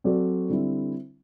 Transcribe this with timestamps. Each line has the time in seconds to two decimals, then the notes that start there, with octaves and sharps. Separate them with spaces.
0.04 F#3 C4 F#4 A4 D5
0.49 D3 G3 C4 E4